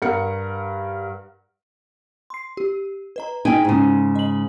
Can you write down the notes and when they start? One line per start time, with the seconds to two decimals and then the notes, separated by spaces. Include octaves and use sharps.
0.02 G2 A#4 F#5 C#7
2.30 C6 C7
2.57 G4
3.16 B4 D#5 A#5
3.45 D#4 G#4 D#5 G5 G#5
3.65 G#2 C#3
4.15 D#5 F#7